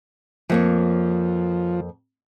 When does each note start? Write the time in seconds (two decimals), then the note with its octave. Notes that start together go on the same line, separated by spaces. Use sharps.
0.50 F2 F3 A#3 C#5